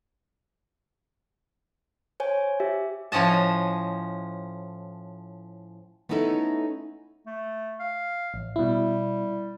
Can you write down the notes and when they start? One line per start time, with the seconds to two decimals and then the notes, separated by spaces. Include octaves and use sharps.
2.20 C5 C#5 G#5
2.60 G4 E5
3.12 A2 F3 C#4 D#5 A5
6.09 A3 B3 C#4 D#4 E4 A4
7.26 A3
7.80 F5
8.34 A1
8.56 B2 G3 E4